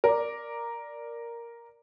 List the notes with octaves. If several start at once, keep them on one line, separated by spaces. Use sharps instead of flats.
A#4 D5